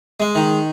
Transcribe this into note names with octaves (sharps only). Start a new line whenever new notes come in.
G#3
D#3